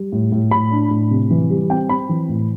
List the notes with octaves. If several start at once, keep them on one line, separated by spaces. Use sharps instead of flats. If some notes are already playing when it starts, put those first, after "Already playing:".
Already playing: G3
A2
A2
A2 B5
D4
A2
C3
E3
G3
C4 G5
C4 B5
E3
A2